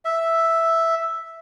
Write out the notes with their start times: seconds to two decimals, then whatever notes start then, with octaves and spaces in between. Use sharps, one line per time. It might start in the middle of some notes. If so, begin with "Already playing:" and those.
0.05 E5